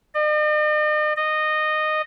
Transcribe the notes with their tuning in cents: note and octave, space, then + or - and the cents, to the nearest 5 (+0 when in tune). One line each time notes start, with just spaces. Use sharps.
D#5 -45
D#5 -15